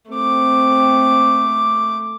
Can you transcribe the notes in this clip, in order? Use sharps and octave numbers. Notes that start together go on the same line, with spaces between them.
A3 C4 D6